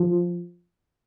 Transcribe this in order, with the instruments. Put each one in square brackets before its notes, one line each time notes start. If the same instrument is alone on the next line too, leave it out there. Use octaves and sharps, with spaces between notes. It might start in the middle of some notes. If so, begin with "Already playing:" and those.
Already playing: [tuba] F3